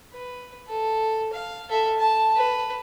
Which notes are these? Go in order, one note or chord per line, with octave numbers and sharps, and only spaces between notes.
B4
A4
F5
A4 E5
A5
B4